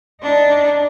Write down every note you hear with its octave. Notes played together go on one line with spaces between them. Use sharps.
D4 D#4